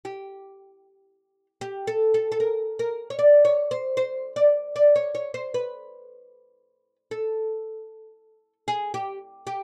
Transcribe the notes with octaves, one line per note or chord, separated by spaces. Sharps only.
G4
G4
A4
A4
A4
A#4
A#4
C#5
D5
C#5
C5
C5
D5
D5
C#5
C#5
C5
B4
A4
G#4
G4
G4